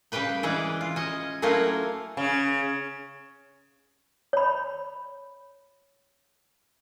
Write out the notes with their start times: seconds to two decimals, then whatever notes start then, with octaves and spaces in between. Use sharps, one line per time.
0.12 C#3 G3 G4 B4 G5
0.43 E3 G#3 C#4 D5
0.81 F4
0.96 C#4 D#5
1.42 F#3 A3 A#3 C#4 E4 F4
2.17 C#3
4.33 C#5 B5